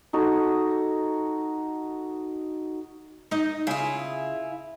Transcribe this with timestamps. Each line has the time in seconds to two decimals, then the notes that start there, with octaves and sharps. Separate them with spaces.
0.13 D#4 F#4 A4
3.31 D#4 D#5
3.67 C#3 E4 F4 G#4